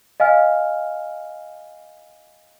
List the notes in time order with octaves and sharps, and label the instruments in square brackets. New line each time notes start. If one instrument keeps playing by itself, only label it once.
[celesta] D#5 F5 G#5 F6